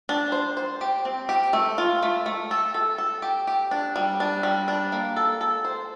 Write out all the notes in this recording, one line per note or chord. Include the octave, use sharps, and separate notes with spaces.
D4
C5
C5
G4
C4
G4
A3
F4
A3
A3
A4
A4
A4
G4
G4
D4
G3
D4
G3
D4
A#3
A4
A4
C5